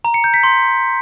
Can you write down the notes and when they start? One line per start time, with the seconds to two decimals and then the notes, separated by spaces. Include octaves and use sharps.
0.05 A#5
0.14 C#7
0.24 G6
0.34 B6
0.43 C6